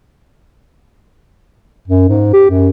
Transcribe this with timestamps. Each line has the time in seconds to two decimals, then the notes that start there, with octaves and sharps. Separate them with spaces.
1.88 F#2
2.09 G#2
2.34 G4
2.50 F#2